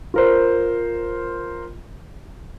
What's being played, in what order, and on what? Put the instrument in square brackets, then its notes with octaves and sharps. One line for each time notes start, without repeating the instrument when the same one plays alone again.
[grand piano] F4 A#4 C5